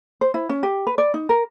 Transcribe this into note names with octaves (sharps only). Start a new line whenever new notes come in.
C5
E4
C#4
G4
B4
D5
D#4
A#4